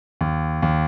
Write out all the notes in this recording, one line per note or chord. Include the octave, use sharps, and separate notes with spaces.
D#2
D#2